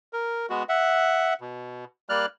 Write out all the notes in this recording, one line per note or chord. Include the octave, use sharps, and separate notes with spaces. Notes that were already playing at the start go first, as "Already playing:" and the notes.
A#4
G#3 B3 F#4
E5 F#5
B2
G3 A#3 D5 F6 F#6